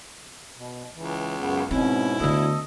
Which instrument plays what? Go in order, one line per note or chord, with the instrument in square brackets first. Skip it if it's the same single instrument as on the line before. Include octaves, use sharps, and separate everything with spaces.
[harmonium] B2
[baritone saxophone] C#2 [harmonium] E3
[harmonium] F#2 C#3 B3
[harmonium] G#2 B2 C#4 [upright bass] C4 [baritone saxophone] E4
[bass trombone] D2 [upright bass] D3 B3 [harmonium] A4 D#5